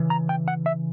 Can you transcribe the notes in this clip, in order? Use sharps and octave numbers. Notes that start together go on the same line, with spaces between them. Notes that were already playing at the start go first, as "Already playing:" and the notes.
Already playing: C#3 E3
A#5
G5
F#5
E5